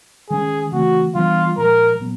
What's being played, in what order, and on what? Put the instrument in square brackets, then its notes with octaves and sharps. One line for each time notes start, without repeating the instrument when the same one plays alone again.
[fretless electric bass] D#3 G#3 C#4 [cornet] G#4
[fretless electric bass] C#3 E3 A3 C4 [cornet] F#4
[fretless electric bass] E3 G3 B3 D4 [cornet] F4
[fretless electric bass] A#2 F3 G#3 [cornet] A#4
[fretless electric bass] A#2 F#3 B3